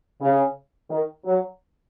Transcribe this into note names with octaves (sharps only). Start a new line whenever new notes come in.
C#3
D#3
F#3